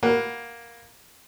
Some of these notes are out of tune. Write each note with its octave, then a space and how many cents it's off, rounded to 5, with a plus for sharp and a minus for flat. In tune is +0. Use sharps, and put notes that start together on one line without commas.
A#3 +5 B4 +0 F#5 +0